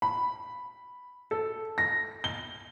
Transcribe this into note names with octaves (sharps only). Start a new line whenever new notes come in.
B5
A4
A#6
G7